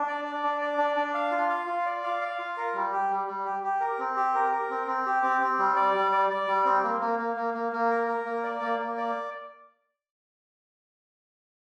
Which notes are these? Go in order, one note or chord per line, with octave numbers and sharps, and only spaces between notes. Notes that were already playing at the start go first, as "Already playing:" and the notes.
Already playing: D4
D5
D5
D4
D5
D4
D4
F5
F4
F5
F4
D5
F5
F5
F4
A#4
G3
G4
G3
G3
G4
G4
A#4
C4
G4
A#4
A#4
C4
C4
G4
C4
C4
G3
D5
G3
D5
D5
G3
C4
A#3
A#3
A#3
A#3
A#3
A#3
A#4
A#4
A#3
D5
A#3
A#3
D5